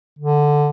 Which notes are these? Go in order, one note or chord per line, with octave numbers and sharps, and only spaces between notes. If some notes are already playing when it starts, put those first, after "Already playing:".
D3